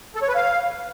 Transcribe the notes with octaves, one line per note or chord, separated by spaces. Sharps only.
A4
C#5
B4
F5